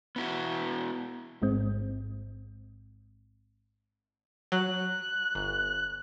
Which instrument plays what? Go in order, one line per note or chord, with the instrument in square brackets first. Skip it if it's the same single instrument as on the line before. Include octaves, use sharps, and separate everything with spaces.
[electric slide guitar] B3 E4 F#4
[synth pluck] A1 G#2 G#3 C4
[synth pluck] F#3 [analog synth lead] F#6
[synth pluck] G1